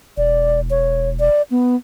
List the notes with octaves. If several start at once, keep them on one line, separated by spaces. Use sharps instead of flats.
E1 D5
C#5
D5
B3